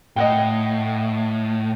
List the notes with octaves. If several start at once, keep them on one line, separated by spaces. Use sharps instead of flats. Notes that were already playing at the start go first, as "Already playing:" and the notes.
A2 D#5 F#5 G5